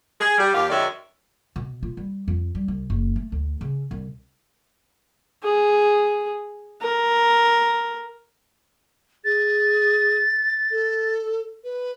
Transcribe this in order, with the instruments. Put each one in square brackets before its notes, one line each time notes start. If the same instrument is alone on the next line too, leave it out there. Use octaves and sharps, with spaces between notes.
[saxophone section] G#4
G3
D#2 G4 F5
F#2 D#3 G#3 C#4 D5 E5
[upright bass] B2
F4
G3
F2
G3
C2
F#1
A3
D2
C#3
C2
[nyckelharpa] G#4
A#4
[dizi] G#4 [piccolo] A6
[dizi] A4
B4